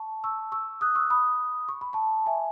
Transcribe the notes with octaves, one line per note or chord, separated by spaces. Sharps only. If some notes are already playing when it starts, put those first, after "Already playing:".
Already playing: A5 C#6
C#6 E6
C#6 E6
D#6 F#6
C#6 E6
B5 D#6
C#6
B5
A5 C#6
E5 G#5